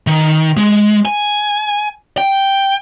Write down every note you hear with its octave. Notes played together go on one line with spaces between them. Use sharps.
D#3
G#3
G#5
G5